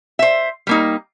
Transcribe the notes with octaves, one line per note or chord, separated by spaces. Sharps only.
C5 E5
G3 A#3 D#4